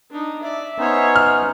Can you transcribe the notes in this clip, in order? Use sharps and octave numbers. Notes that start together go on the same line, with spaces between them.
D4 D#4
D5 E5
B3 C#4 D#4 C5 C#5
F6